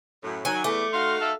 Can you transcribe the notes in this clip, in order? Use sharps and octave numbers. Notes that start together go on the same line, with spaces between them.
F#2 A2
D#3 F#3 G#5
E2 E3 A3 D6
D#4 F#4 F5 C6
A4 E5